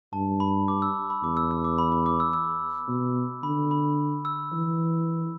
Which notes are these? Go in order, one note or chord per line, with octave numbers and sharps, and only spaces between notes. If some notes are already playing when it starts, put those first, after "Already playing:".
G2 A5
B5
D6
E6
B5
E2 D6
E6
E6
D6
B5
B5
D6
E6
E6
B2
D3 B5
B5
E6
E3